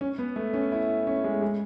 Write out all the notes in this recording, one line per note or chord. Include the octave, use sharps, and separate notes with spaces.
C#4
B3
A3
C#4
E4
C#4
G#3
G#3